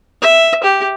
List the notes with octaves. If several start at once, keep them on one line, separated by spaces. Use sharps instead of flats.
E5
G4